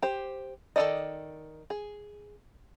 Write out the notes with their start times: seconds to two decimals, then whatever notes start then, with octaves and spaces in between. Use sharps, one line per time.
0.02 G4 C5
0.76 D#3 F#4 A4 D5 D#5
1.70 G#4